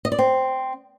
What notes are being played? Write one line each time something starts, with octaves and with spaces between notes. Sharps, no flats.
D#5
D5
C4